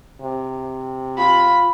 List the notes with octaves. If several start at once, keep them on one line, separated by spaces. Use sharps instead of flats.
C3
F4 B5